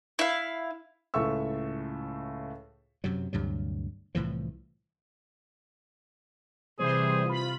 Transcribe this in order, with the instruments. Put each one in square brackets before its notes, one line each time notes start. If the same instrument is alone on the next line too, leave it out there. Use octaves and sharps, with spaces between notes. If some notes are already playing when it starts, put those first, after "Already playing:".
[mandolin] E4 F5
[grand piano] C#2 A2 A4 E5 C#6 E6
[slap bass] F#2 C3 F#3
D2 G2 C3 F#3
C2 A2 E3 F3
[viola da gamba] C3 [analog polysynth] E3 G3 C5 [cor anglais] G#4
[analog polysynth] F4 B5